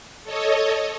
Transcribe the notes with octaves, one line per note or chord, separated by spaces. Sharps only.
A4 C#5 D#5